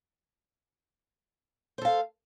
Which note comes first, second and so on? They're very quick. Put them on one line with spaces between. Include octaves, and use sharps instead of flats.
C5 A4 F5